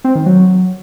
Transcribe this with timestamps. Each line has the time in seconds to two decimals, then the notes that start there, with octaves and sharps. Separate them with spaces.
0.04 C4
0.15 D#3
0.26 F#3